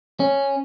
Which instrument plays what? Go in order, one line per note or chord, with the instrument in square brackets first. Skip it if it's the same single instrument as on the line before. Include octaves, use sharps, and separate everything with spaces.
[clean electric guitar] C#4